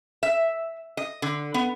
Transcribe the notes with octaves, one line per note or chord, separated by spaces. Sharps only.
E5
D#5
D3
B3